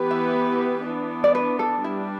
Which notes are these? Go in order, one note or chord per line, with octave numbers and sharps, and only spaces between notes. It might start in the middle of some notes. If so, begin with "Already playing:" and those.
Already playing: E3 B3 G4 B4
E5
E3 B3 D4
D5
B4
A4
G3 D4 E4 B4